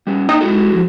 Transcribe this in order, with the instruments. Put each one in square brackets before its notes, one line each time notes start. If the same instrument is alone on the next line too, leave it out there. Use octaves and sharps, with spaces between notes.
[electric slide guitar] G3 C#4
[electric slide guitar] A#3 E5 G5 [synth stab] D#4
[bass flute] G#3 [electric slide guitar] E4 F#4 A4
[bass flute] F3